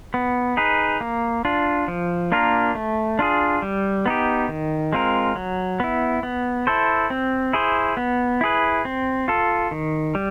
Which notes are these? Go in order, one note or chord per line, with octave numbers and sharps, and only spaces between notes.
B3
D#4 G#4 B4
A#3
D4 F4
F3
A#3 D4 F4 A#4
A3
D4 F4 G#4
G3
B3 D#4 G4
D#3
G#3 C4 F4 A#4
F#3
B3 E4
B3
E4 A4 C5
C4
E4 G#4 C5
B3
E4 G#4 B4
C4
F4 A4
D#3
G3